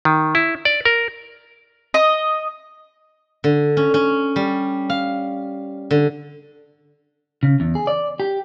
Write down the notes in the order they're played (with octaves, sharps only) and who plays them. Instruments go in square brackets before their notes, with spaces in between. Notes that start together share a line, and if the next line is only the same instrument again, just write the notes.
[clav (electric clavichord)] D#3
E4
D5
A#4
[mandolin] D#5
[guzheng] D3
C#4
C#4
G3
F5
D3
[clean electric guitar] C#3
E2
G#4
D5
G4